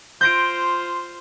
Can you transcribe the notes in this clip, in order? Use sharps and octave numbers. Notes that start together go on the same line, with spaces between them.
F4 C5 G6 A#6 D7